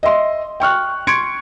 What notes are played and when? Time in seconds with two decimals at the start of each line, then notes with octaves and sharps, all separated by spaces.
0.03 D#5 E5 C6
0.60 G5 C#6 F6 F#6
1.07 C6 C#6 G#6 C#7 D7